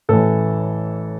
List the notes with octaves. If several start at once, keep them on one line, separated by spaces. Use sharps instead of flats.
A1 A2 E3 A4